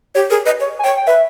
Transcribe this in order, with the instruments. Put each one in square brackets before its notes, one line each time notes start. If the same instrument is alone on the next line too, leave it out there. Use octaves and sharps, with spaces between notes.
[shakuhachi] G4 [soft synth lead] C#5
[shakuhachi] G#4 [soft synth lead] A#4
[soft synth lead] B4 [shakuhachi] D#5
[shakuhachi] C#5
[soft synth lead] G#5
[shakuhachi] C#5 [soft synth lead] G5
[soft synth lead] G5
[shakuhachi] B4 [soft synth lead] E5